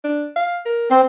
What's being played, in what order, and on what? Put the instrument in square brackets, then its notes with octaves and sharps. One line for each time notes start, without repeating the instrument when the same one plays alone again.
[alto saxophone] D4
F5
A#4
[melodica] C4 [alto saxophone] C5